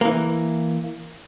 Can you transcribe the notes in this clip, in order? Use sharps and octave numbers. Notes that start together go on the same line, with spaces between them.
E3 A#3